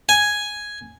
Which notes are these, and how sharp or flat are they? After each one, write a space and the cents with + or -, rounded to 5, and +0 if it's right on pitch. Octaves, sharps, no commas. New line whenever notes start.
G#5 +0